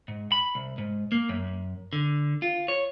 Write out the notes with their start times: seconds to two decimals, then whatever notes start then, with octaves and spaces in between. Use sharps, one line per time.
0.08 G#2
0.32 B5
0.55 C2
0.78 G#2
1.12 A#3
1.29 F#2
1.93 D3
2.42 F4
2.68 C#5